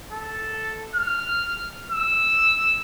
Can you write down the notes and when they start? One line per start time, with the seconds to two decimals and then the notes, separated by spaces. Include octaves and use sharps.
0.12 A4
0.95 F6
1.91 E6